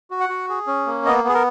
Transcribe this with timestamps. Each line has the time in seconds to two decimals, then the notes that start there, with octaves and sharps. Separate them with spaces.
0.11 F#4
0.20 F#5
0.29 F#4
0.49 G#4
0.67 C#4
0.87 A#3
1.05 B3 D#5
1.24 B3 G#4
1.34 A#4